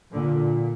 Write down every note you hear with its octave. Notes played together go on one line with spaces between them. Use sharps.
A#2 D3